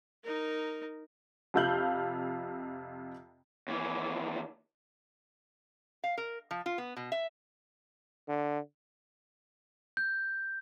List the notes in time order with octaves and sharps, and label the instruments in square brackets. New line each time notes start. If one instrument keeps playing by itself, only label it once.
[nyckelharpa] D#4 A#4
[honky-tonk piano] F2 C3 F4 F5 G6 F#7
[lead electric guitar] D#2 E3
[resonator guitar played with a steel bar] F5
A#4
F3
F4
B3
B2
E5
[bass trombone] D3
[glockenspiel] G6